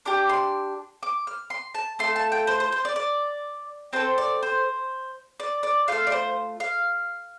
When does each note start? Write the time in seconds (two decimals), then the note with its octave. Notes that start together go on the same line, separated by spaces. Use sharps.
0.05 D4 G4 D6
0.29 C6
1.03 D6
1.27 F6
1.50 C6
1.75 A5
1.99 A3 F4 A4 C6
2.16 A5
2.32 G5
2.47 C5
2.60 C5
2.72 C5
2.85 D5
2.96 D5
3.93 C4 F4 A4 C5
4.18 D5
4.43 C5
5.40 D5
5.63 D5
5.88 A3 F4 A4 F5
6.07 D5
6.12 C5
6.60 F5